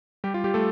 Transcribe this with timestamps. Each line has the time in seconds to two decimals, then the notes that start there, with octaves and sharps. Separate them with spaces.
0.24 G3 G4
0.34 F4
0.44 G3 G4
0.54 A3 A4